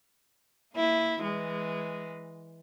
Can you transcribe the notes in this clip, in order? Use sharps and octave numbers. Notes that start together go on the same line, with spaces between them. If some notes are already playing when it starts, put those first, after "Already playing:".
A#3 E4
E3 G#3